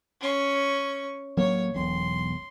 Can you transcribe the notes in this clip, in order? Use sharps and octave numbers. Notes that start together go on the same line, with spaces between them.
C#4 C#6
D1 F#3 A#3 C#5
E1 B1 C6